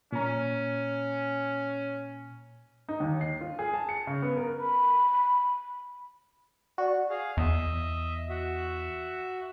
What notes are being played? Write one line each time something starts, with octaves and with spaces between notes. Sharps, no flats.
A#2 C#4 A#5
D#4
D#2
C7
F4
G#4
A5
C#7
C#3
B3
A#4
B5
F#4 D5
G#4 F5
E2 D#5 E5
F#4 E5